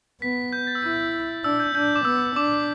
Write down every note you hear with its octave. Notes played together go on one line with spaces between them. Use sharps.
B3 B6
G6
A6
E6
E4 G6
D4 E6
G6
D4 G6
D6
B3 E6
D4 D6